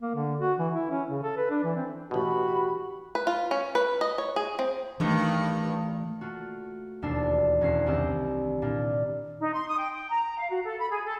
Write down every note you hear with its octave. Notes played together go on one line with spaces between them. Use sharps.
A#3
D3
F#4
E3
E4
C#4
C#3
A4
B4
D4
E3
C4
A1 B2 F#4 G4 B5
B4
F4
C#4
B4
D#5
C#5
G#4
C4
G2 D#3 E3 A3
A3 A#3 F4 F#4
E1 D#2 D4 A5 E6 C7
E1 E2 C#4 E5 C7
C2 D#3 C4 G4 D#5 E6
A#2 D4 E4 F4
D#4
C6
D#6
G5
G5
A#5
F5
F#4
A4
B5
G#4
A4